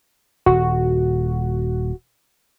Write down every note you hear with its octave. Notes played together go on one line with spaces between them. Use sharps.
D#1 F#4